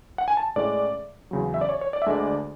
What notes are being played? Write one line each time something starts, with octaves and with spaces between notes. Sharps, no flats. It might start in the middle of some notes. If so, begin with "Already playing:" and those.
F#5
G#5
A5
A2 G#3 C#4 D5
E2 C#3 F#3
E5
D5
C#5
C#5
D5
E5
D2 D3 G#3 D4 D5